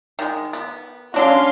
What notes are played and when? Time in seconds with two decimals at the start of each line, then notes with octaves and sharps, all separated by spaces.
0.19 D#3 G#3
0.53 B3
1.14 F#3 C#4 D4 F#4 F5 C6